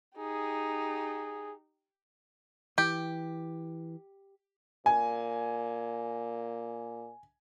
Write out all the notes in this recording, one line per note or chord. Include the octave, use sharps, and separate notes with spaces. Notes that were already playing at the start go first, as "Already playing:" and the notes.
D#4 G4 G#4
E3 G4
A#2 G#5